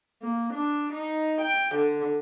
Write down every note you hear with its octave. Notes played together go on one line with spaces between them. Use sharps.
A#3
D4
D#4
G5
D3